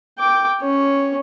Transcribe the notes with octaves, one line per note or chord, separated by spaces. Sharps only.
G5 D6
C#4 C#5